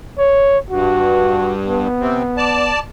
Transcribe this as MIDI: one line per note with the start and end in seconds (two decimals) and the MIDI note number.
0.19 0.58 73
0.71 1.88 43
0.71 1.52 66
1.67 2.74 59
2.00 2.22 48
2.00 2.22 60
2.37 2.79 74
2.37 2.79 81